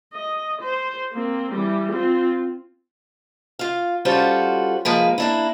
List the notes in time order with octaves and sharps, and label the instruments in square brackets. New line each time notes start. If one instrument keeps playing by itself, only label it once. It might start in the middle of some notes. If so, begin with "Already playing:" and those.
[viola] D#5
C5
A#3 C4
E3 G3
C4 F4
[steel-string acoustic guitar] F4 F5
G3 C#4 F4 F#4 A4 C5
F3 G#3 A#3 B4
A#3 D4 E4